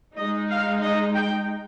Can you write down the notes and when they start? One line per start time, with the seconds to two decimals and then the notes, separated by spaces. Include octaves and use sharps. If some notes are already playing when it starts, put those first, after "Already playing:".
0.16 G#3 D#4 D#5
0.50 F5
0.82 D#5
1.15 G5